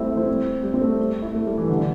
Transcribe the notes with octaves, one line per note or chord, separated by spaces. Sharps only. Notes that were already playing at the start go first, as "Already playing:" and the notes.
Already playing: G3 A3 C4 E4
C4
G3
C4
A3
E4
A3
G3
E3
D3
E3